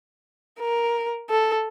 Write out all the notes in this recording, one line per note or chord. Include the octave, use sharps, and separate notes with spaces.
A#4
A4